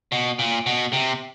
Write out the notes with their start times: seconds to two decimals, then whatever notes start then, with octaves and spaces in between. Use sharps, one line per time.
0.12 B2
0.39 A#2
0.66 B2
0.93 C3